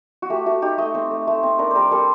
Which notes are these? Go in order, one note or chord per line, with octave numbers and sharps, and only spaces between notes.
F#4
A3 G4
A3 F#4
D#4 G4
A3 D#5
C4 C5
A3
A3
C4
D4 A#4
G3 A#4 C5
G3 A4